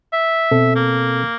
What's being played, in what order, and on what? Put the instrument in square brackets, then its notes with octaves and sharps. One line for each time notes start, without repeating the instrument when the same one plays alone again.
[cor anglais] E5
[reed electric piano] B2 C4 A4
[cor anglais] A#3